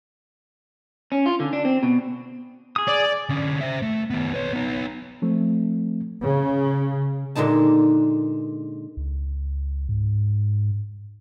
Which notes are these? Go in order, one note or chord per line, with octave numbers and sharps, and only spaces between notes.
C#4
F4
D3
D4
C4
B2
G#4 D#6
D5
D3 C#4
C5 E5
A3
D#3 B3
B4 C#5
B3 D#4
F3 A3 C4
C#3
A#2 D3 G#3 D#4 A5
C#2
G#2